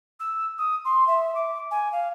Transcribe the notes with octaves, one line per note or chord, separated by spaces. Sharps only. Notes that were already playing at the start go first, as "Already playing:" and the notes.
E6
D#6
C6
E5
D6
G#5
F5